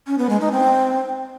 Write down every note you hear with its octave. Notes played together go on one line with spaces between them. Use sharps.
C#4
B3
G#3
D#4
C4